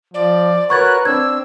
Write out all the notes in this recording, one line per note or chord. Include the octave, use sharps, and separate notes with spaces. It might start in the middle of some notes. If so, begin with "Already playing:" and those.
F3 D5
F#4 A#4 B4 C#5 C#6 F#6 G#6 A6
C4 D4 E6 G#6